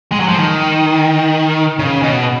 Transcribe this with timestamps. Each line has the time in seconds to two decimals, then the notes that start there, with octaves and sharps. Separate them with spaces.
0.12 G#3
0.20 F#3
0.28 F3
0.37 D#3
1.79 C#3
2.03 B2